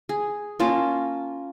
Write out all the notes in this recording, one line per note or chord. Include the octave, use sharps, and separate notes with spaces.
G#4
A#3 C#4 F4 A5